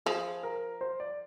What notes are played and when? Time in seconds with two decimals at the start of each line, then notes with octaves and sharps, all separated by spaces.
0.06 F3 G#4
0.43 A#4
0.81 C5
1.00 D5